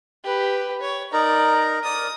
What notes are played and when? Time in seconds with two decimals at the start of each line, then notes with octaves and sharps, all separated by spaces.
0.24 G4 B4
0.82 C#5
1.13 D#4 A#4 D5 A#5
1.84 A#4 D5 D#6